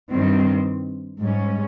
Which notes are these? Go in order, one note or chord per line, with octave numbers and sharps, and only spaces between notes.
G2 D#3 G3 C4
G#2 G3 C#4